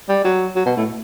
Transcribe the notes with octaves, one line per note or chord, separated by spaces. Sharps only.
G3
F#3
F#3
B2
A2